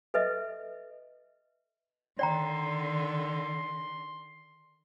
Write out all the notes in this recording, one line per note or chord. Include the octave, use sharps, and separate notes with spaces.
A4 B4 D#5 E5
D3 D#3 D5 G5 A#5 C6